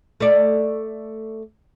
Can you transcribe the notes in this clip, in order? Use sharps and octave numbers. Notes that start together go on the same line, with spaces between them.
A3 D5